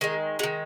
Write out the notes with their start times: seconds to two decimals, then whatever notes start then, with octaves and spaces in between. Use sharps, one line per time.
0.01 D#3 G#3 G#4
0.39 G#3 F#4
0.43 D#3